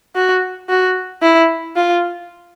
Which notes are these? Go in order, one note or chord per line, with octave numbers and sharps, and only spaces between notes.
F#4
F#4
E4
F4